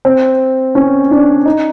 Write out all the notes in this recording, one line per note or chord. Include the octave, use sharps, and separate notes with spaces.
C4
C#4
D4
D#4